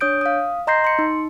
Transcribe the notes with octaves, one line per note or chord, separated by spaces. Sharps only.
D4 C#5 D#6 G6 D7
F5 D#6
D#5 A#5 C6 G6 A#6 C7
C6 C#7
D#4